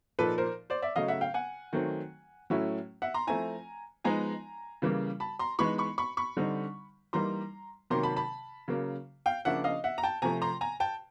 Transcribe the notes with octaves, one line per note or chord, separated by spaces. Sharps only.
A#2 F3 A#3 D#4 A4 B4
A#4 C5
C5 D5
D5 E5
C#3 F#3 A3 D#5 F5
E5 F#5
F5 G5
F#5 G#5
D#3 F#3 A3 C4
A2 F#3 A3 C#4 E4
E5 F#5
A#5 C6
F3 A3 C4 E4 G#5 A#5
F3 G#3 B3 D#4 G#5 A#5
C#3 E3 G3 A#3
A5 B5
A#5 C6
E3 G#3 B3 D#4 B5 C#6
B5 C#6
B5 C#6
B5 C#6
D3 G3 C4 D#4
E3 G3 A#3 D#4 A#5 C6
C3 D#3 F#3 A#3 A#5 C6
A5 B5
A5 B5
C#3 F#3 A#3
F5 G5
C#3 F3 A#3 D4 E5 F#5
D#5 F5
E5 F#5
A#5
G5 A5
C3 F3 A3 G#5 A#5
A#5 C6
G#5 A#5
G5 A5